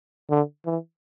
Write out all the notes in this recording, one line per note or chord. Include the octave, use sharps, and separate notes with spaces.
D3
E3